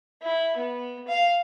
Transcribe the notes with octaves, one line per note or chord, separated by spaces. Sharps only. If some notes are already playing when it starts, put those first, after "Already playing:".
E4
B3
F5